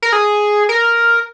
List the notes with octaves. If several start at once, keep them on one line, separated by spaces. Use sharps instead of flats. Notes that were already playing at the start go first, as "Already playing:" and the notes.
A#4
G#4
A#4